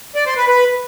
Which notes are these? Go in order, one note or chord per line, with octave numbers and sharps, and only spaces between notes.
D5
C5
B4
B4